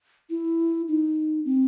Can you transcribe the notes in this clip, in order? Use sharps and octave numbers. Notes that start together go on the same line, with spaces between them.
E4
D#4
C4